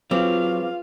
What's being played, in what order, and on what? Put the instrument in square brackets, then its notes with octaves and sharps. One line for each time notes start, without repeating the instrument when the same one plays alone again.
[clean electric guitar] F#3 [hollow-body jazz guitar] C4 [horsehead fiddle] F4 F5 [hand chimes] G#4 B4 D6